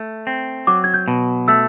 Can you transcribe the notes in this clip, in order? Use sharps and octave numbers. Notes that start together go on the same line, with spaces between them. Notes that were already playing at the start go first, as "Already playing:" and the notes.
Already playing: A3
C4
F#3 D6
G#6
G6
B2
A3 E6